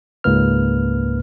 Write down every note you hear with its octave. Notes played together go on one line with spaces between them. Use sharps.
C#2 G#2 A#3 B4 F6